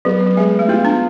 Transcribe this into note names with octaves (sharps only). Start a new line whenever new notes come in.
F#3 B3
F#3
G#3 G#4
A3
B3 F4
D4